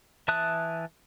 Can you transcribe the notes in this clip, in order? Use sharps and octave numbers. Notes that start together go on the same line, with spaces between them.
E3 E5 A5 D#6 F#6